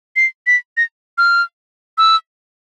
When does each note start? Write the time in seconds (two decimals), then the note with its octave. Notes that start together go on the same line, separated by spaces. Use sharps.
0.16 C7
0.47 B6
0.77 A#6
1.18 F6
1.98 E6